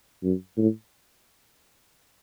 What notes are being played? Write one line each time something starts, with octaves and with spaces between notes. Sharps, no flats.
F#2
A2